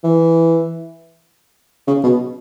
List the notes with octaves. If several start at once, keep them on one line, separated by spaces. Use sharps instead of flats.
E3
C#3
B2